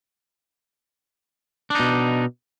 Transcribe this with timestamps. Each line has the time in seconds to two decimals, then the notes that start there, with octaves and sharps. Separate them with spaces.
1.70 D4
1.75 D#4
1.80 B2